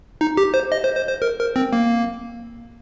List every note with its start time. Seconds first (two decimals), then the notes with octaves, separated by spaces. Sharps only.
0.21 D#4
0.37 G4
0.54 C5
0.72 D#5
0.84 C5
0.97 C5
1.09 C5
1.22 A#4
1.39 A#4
1.56 C4
1.73 A#3